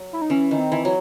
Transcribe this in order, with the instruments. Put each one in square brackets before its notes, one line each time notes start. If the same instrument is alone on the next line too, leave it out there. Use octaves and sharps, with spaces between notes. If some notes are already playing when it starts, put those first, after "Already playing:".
Already playing: [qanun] F#3
[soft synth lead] E4
D#4
[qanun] E3 [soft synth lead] C#4
[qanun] D#3
[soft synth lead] C4
[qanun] E3
F#3